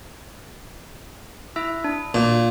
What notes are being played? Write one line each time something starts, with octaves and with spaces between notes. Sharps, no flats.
E4 E5 E6
D4
A#2 F4